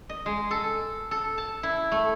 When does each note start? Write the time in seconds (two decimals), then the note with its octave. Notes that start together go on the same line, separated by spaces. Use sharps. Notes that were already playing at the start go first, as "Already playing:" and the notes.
0.09 D#5
0.26 G#3
0.51 A4
1.11 A4
1.38 A5
1.63 E4
1.92 A3